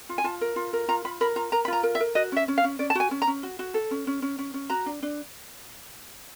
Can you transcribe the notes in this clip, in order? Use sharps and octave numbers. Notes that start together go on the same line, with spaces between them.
F4
G#5
F4 A5
A#4
F4
A#4
F4 A#5
F4 B5
A#4 B5
F4 A#5
A#4 A#5
B5
F4 A#5
A#4
E5
A#4
F#4 D#5
C#4 E5
C#4
F5
C#4
C#4 D5
A5
F#4 G#5
C#4
A#5
C#4
F#4
F#4
A4
C#4
C#4
C#4
C#4
C#4
F#4 A#5
D4
D4